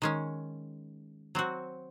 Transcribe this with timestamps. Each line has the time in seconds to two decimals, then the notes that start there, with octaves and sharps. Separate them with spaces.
0.02 D#3 G#3 C#4
1.35 F#3 C4 F#4